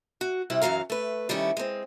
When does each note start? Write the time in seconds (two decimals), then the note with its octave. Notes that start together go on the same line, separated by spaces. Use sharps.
0.21 F#4
0.50 C3 G3 E4 E5
0.62 F#2 E3 F#3 F5 A#5
0.90 A3 B4
1.29 D#3 G3 A3 C#4 E4
1.57 G#3 C4